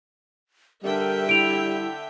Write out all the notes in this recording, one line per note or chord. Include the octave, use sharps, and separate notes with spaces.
D3 G3 A#4 E5 G5
E4 D7 F7